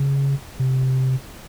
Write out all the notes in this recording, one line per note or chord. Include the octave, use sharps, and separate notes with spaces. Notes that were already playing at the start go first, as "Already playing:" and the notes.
Already playing: C#3
C3